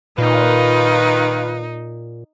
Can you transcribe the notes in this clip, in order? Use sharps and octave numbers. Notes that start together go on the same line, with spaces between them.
A#2 D#3 D#4 F4 B4